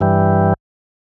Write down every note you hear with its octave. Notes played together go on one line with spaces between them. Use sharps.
G2 E3 G3